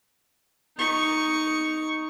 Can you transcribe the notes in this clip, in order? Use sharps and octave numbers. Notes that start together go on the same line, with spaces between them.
D#4 C#6